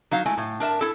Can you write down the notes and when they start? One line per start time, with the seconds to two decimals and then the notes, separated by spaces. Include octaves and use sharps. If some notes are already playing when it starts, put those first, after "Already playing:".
0.11 F#3 D#4 F5
0.25 G#3 A3 E4
0.38 A2
0.60 D4 A#4 E5 A5
0.81 E4 A4